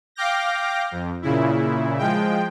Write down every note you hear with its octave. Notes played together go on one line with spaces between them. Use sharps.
F5 G5 D6 F6 G6 A#6
F2
A#2 C#3 E4
F3 G#3 G5